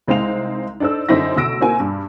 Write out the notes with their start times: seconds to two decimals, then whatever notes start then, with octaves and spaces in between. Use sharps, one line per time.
0.08 C2 G#3 C4 D#4 F5 F7
0.80 D4 D#4 A4 C5 E6
1.09 F#2 D3 C4 D#4 E4 A#6
1.36 D2 B2 E6 A#6 D7
1.61 A#3 C4 E4 F#4 G#5
1.80 G2